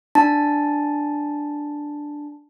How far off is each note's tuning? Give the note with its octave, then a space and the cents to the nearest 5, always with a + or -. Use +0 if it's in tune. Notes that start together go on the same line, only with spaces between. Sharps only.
D4 +0 A5 +0